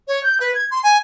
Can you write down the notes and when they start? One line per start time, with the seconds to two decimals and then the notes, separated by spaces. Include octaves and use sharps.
0.08 C#5
0.23 G6
0.40 B4
0.55 G#6
0.71 C6
0.84 G#5